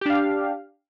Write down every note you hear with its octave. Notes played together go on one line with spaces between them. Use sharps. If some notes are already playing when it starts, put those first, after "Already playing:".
D4 G4 F5